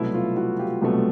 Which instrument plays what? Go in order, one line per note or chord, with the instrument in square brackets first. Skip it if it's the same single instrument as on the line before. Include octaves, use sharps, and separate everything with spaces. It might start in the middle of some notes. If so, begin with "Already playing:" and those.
Already playing: [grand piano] C2 B2 F#3 A3 E4
F4
E4 F#4
F4 G4
C2 B2 F#3 A3